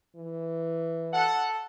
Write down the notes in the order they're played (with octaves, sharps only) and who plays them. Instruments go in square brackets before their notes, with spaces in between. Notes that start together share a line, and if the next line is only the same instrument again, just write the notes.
[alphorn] E3
[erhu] A4 [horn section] F#5